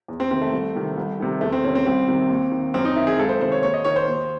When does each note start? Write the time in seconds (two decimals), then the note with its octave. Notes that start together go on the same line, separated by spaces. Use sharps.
0.08 E2
0.20 C4
0.31 C3 D#3 C4
0.42 A3
0.52 C2
0.75 C3 D#3
0.97 C2
1.20 C3 D#3
1.41 E2 A3
1.52 C4
1.64 C3 D#3 C#4
1.75 C4
1.86 C2 C4
2.08 C3 D#3
2.29 D#2
2.52 D#3
2.74 F#2 C4
2.85 D#4
2.96 D#3 E4
3.07 G#4
3.19 C#2 A4
3.29 C5
3.41 C3 D#3 C5
3.52 C#5
3.62 D#2 C#5
3.74 D#5
3.85 D#3 C#5
3.96 C5
4.08 D#2